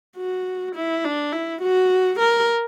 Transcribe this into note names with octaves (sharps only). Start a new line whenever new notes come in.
F#4
E4
D4
E4
F#4
A#4